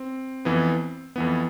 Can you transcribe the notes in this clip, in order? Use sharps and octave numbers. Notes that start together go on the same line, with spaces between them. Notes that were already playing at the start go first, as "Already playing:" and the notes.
Already playing: C4
F2 E3 B3
F2 E3 B3